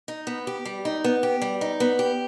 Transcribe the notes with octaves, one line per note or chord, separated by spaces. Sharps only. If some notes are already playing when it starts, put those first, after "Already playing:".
D#4
B3
G4
G3
D#4
B3
G4
G3
D#4
B3
G4